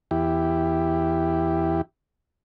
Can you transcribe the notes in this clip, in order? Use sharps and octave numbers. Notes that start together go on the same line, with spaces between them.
E2 E4 G4